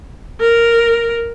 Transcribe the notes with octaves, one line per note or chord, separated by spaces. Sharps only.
A#4